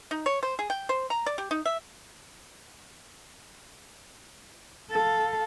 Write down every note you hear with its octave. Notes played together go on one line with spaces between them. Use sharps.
D#4
C#5
C5
G#4
G5
C5
A#5
D5
G4
D#4
E5
A4 F5